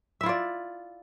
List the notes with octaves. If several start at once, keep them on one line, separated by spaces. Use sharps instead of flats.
E4 F4 D5 E5